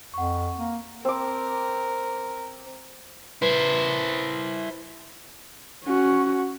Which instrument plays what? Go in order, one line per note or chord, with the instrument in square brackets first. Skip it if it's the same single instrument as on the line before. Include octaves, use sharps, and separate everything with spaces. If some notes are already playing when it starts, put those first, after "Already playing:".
[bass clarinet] F2 [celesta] F#5 C#6
[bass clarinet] A#3
[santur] C4 D6 [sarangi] A#4
[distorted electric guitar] E4 C5 [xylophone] B4
[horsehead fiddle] C#4 F#4